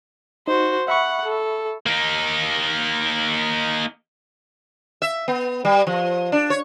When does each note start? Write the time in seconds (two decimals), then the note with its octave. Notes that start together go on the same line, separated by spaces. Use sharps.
0.48 D#4 F#4 C5
0.88 E5 F#5 B5 C#6
1.24 A4
1.86 A#3 D#4
5.02 E5
5.28 B3
5.65 G3
5.87 F3
6.32 D4
6.50 C#5